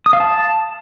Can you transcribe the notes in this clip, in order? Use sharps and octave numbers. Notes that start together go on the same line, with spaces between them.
D#6
F5
A5